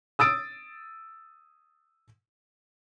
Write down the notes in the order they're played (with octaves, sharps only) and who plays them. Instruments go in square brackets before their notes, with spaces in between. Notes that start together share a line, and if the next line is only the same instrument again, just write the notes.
[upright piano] D#6 E6 A6 D7